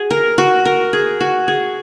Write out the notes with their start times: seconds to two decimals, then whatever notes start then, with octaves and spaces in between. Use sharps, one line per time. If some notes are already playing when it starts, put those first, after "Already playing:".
Already playing: F#4 G#4
0.11 A#4
0.38 F#4
0.65 A#4
0.93 G#4
1.20 F#4
1.48 G#4